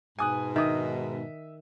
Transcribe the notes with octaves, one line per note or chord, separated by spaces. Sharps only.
G#2 B2 G#5 D#6 F#6
D#3 E5 D#6